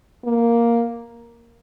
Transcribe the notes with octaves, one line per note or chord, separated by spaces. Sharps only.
A#3